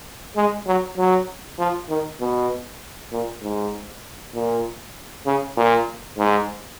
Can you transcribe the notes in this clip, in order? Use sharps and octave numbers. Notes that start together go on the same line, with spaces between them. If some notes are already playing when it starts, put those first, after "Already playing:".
G#3
F#3
F#3
F3
D#3
B2
A#2
G#2
A#2
C#3
A#2
G#2